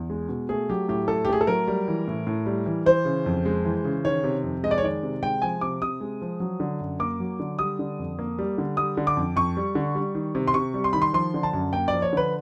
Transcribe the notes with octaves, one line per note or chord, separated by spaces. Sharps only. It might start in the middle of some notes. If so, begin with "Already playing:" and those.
Already playing: E2
G#3
B2
A3 G#4
F#3 G4
A2 G4
A2 A4
G4
A3 G#4
A4
F#3 A#4
G3
E3
A2
A2
G3
E3
E3 C5
C#3
F2
G#3
E3
C#3
D#3 C#5
C3
F2
G#3 D#5
D5
C#5
D#3 D5
C3
G#3 G5
F3 G#5
C3 D6
C3 D#6
G#3
F3
F#3
D3
F#2
A#3 D6
F#3
D3
G3 D#6
D3
F2
A#3
G3
D3
G3 D#6
D3
D6
F2
F2 C#6
G3
D3
G3
D#3
C3
C6
C3 C#6
G3
C6
D#3 B5
C6
F3 C6
D3
A5
F#2
A#3 G5
D5
F3
C#5
D3 B4